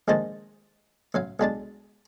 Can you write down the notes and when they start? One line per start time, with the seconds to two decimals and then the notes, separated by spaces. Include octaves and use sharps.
0.08 A#1 D#3 G#3 C5 D#5 A5
1.14 A1 F#3 F5
1.40 B1 G#3 D4 A5